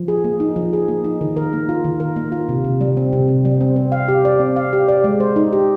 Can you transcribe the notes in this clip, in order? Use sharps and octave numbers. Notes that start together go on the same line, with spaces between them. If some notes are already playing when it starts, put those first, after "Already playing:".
Already playing: F3
G#4
A#3
D#4
F3
G#4
A#3
D#4
D#3
A#4
A#3
F4
D#3
A#4
A#3
F4
C3
C3
G3
C4
C3
C3
G3
C4
C4
F5
G4
D5
C4
F5
G4
D5
G#3
C5
D#4
G4